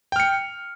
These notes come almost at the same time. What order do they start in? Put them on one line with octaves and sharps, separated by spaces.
G5 F6 C#7